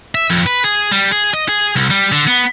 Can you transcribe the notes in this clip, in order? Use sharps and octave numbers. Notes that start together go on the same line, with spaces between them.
E5
F2
B4
G#4
G3
G#4
D#5
G#4
C2
G3
D3
B3